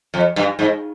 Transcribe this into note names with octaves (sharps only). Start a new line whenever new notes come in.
F2
G2
G#2